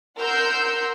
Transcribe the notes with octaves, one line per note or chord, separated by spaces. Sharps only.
A#4 F#5 C6 E6 G6